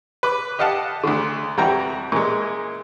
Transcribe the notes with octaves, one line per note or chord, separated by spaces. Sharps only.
B4 D6
G4 D#5 F5 F#5 A5
D2 D3
F2 E3 G3 F#4 G5 A#5
A#2 E3 G#3